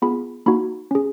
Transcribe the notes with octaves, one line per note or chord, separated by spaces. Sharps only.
B3 F4 G#4 B5
A#3 D#4 F#4 B5
C#4 G#4